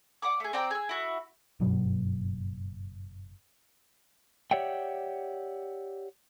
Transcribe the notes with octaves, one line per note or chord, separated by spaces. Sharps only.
D5 F#5 B5 D6
A3 G#4
C4 D5 G5 A#5
G#4 E6
E4 F#4
F#1 G2 B2 F#3
G4 C#5 D5 E5 F#5 G5